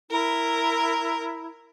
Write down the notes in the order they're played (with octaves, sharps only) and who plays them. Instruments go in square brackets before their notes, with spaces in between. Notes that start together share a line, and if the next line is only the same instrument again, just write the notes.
[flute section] E4 [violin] A#4